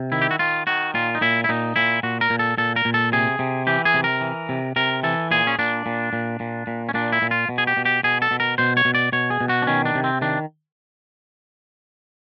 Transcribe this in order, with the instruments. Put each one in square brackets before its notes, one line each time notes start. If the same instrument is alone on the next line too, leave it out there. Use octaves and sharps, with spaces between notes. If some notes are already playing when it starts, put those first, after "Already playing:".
Already playing: [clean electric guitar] C3
D#3 E4
G4
F#4
D#3 F4
D#3 F#4
A#2 F4
D#4
A#2 E4
E4
A#2 D#4
A#2 E4
A#2 F#4
A#4
A#2
A4
A#2 A4
A#4
A#2
A4
C3 G#4
C3
E3 G4
G#4
C3
A#4
E3
C3
C3 A#4
E3 A4
A#2 G#4
C#4
A#2 D4
A#2
A#2
A#2
A#2
C#4
A#2 D4
E4
A#2
F4
B2
G#4
G4
B2
G4
B2 G#4
A4
B2
A#4
B2 C5
C#5
B2
D5
B2 C#5
G#4
B2
F#4
D4
D#3 C#4
D4
C3
C4
D#3 D4